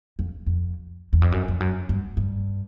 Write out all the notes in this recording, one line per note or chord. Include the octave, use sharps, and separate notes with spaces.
F2
F2
E2
F2
F#2
F2
F#2
G2
G2